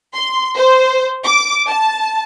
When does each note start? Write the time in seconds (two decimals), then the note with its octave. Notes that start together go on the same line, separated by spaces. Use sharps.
0.15 C6
0.56 C5
1.25 D6
1.67 A5